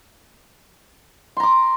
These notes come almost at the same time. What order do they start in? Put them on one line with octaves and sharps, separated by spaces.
C6 A#5 D6